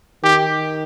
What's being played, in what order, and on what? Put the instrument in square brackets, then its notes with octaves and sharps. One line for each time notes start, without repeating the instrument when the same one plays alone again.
[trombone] D#3 [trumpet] G4